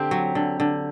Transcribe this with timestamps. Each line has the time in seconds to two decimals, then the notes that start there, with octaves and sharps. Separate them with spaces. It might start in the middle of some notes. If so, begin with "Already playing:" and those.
Already playing: D3 C4 G4
0.11 F#3
0.35 D3
0.60 D3